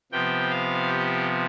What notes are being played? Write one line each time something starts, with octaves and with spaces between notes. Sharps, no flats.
C3 F3 B3 G5
F5
G4